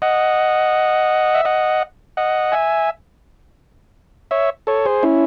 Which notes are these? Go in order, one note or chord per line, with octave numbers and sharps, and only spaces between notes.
D#5 F#5
E5
D#5 F#5
D#5 F#5
E5 G#5
C#5 E5
A4 C#5
G#4 C5
C#4 E4